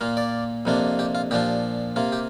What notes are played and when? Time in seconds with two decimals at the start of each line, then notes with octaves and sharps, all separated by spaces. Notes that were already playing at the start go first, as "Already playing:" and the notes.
0.01 A#2 A#3 F4
0.17 D5
0.65 F2 C3 A#3 D4 F4
0.99 G4
1.15 F4
1.31 A#2 F3 D4 F4 G4
1.96 C3 A#3 F4
2.12 G4